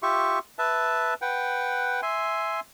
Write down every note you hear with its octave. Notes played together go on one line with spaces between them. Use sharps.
F4 G4 E5 C#6
B4 E5 A5
B4 F#5 G5
E5 G#5 C6